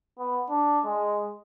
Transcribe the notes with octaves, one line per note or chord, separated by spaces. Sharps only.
B3
D4
G#3